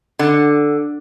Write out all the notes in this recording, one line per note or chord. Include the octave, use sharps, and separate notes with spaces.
D3